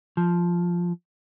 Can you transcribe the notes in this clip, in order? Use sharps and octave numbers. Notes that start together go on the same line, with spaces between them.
F3